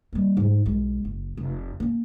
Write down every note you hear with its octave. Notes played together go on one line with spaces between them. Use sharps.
G3 A#3
G#2
B1 G#3
F#1
F1
A#3 C#4